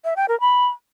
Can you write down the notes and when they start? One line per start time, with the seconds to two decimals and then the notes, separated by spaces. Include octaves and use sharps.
0.05 E5
0.17 G5
0.29 A#4
0.41 B5